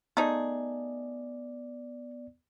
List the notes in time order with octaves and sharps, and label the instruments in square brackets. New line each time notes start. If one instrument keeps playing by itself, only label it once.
[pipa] A3 D#4 G#4 [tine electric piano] B3 D5